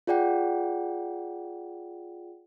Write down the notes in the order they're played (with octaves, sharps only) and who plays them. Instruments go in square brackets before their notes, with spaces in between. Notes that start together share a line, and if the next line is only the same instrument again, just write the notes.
[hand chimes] F4 G#4 D5 F#5 G5